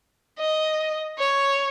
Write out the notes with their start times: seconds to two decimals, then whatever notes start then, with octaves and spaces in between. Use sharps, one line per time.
0.39 D#5
1.18 C#5